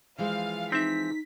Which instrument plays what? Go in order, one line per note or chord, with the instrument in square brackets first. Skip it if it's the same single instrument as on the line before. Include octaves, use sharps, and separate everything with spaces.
[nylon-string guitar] E3 F3 G#3 [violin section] F5
[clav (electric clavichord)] C4 E5 [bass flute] D#4 [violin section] B6